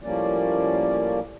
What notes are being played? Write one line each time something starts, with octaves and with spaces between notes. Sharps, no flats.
A2 F3 G3 A#3 C#4 D5